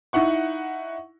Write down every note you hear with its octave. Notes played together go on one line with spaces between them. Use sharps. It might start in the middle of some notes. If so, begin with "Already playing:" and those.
D#4 E4 F#5 C#6